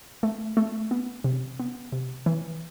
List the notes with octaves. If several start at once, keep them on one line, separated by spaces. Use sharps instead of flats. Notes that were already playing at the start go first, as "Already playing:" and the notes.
A3
A3
B3
C3
B3
C3
E3